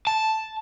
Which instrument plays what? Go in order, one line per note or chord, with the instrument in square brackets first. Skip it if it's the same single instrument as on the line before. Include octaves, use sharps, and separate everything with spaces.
[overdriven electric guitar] A5